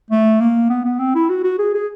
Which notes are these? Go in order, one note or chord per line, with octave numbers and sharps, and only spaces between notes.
A3
A#3
B3
B3
C4
E4
F#4
F#4
G#4
G#4